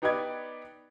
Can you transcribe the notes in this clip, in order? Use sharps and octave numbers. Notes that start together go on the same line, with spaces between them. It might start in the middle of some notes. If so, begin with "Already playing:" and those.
B3 D#4 G4 B4 D5 G#6